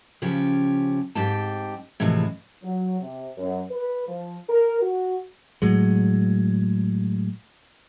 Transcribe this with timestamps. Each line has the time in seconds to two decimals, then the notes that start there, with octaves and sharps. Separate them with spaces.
0.22 C#3 F3 C#4 G4
1.15 G#2 C4 G4 G5 A5
2.00 A2 C3 E3 F3 G#3
2.64 F#3
3.02 C3
3.37 F#2
3.70 B4
4.07 F3
4.49 A#4
4.82 F#4
5.62 A2 F#3 G#3